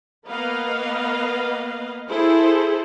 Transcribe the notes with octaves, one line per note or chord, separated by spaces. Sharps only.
A#3 B3 B4 D#5 F5
E4 G#4 A4 C5